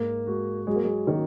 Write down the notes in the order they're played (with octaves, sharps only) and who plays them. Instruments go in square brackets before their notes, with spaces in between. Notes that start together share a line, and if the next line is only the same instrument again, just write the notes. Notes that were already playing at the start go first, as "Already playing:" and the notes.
Already playing: [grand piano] G#2 [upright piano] A#3
[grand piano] G#3 F#4
[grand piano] F#3 [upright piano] G#3
[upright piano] A#3
G#3
[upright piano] D#3 [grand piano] A#3 C#4